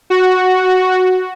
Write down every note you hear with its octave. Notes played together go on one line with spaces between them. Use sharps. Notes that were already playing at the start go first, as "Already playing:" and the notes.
F#4